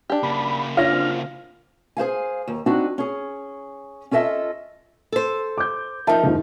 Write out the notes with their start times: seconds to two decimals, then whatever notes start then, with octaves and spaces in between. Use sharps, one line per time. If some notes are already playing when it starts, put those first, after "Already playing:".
0.10 D4 G4
0.23 C#3 A#3 B5
0.77 D4 F4 C#5 F6 A#6
0.92 C4
1.97 G#4 C5 F5 G#5
2.48 D#2
2.66 C4 D4 D#4 F#4
2.98 C#4 G#4
4.11 C#4 F4 A4 D#5 E5
5.12 A4 C5
5.58 D6 G6
6.07 F3 D#4 A#4 E5 A5
6.24 F#1 D#2